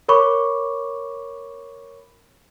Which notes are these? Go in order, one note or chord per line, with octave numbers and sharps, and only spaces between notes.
A#4 C#5 B5 C#6 D6